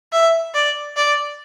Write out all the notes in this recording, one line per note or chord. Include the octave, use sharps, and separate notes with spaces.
E5
D5
D5